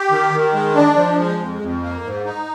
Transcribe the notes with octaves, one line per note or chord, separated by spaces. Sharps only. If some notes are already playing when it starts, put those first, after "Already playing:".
Already playing: G4
D#3
D#3
G#3
D4
F3
G#3
F2
F2
A#3
G#2
D#4